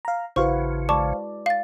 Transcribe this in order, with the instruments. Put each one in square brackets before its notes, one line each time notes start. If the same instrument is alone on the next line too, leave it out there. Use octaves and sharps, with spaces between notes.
[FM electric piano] F5 A#5
[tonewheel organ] A1 C#3 [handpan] E4 F#4 B4 [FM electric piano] C5 F5 [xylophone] C#6
[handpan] G#3 D5 [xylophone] A5 C#6 D6
[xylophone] F5 A6